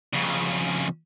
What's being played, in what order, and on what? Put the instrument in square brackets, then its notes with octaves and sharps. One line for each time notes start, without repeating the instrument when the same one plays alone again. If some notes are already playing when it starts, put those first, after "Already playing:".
[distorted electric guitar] F2 C#3